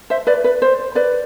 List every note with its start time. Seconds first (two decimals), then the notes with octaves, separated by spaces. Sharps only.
0.10 C5 E5
0.27 B4 D5
0.44 B4
0.62 C5
0.95 B4 D5